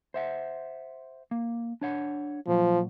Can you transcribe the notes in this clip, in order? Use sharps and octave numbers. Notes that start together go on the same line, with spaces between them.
C5 E5 F#5
A#3
D4 C#5 F#5
A#2 F3 F#3